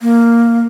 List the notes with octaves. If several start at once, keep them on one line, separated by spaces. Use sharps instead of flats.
A#3